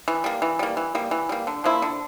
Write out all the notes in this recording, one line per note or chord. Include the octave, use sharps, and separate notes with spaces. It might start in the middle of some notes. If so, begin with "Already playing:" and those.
E3
G3 A#3
E3
G3 A#3
E3
G3 A#3
E3
G3 A#3
D3
F3 A#3 E4
D3